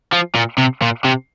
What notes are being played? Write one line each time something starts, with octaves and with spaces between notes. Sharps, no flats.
F3
A#2
C3
A#2
C3